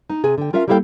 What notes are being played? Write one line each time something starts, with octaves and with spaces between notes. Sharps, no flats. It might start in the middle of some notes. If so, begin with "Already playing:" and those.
D#4
C3 G#4 G#5
D3 G5
C#4 F4 A#4 E5 F5
G3 A#3 E4 A4 F5 G5